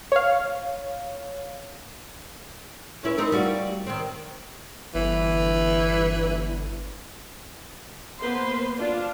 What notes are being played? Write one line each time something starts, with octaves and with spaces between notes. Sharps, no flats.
C#5 F5
C#4 E4 B4
C4 D#4 A#4
G3 F4 F#4
D#3 C4
G1 E3
A#3 B3 B4 C5 C6
D4 F4